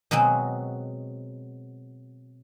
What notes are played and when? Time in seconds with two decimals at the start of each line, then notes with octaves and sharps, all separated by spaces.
0.11 B2 F#3 G#3 C4 F#4